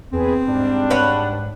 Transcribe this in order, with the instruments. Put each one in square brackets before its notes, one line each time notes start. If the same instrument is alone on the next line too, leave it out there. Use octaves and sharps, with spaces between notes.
[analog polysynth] E2 G#4 B4 [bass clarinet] C4
[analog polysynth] G#2 [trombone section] G3 D4
[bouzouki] B4 C#5 F#5